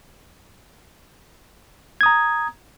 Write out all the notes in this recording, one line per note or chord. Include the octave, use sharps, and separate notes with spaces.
A#5 D#6 G#6